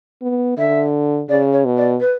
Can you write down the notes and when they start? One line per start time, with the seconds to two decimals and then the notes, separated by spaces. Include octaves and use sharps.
0.22 B3
0.58 D3 E5
1.29 C#3 D5
1.53 C#5
1.65 B2
1.77 D5
2.00 B4